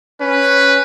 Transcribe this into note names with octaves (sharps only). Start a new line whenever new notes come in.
C#4 B4